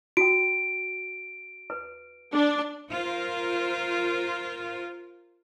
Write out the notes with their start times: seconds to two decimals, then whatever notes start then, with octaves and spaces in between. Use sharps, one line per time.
0.17 F#4 G5 D7
1.70 B4
2.32 D4
2.89 F4 A#4 C5